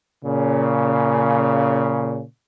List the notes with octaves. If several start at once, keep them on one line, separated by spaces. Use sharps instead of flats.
A#2 C#3